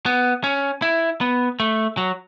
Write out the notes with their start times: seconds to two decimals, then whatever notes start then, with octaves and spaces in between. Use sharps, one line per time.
0.06 B3
0.44 C#4
0.82 E4
1.21 B3
1.60 A3
1.97 F#3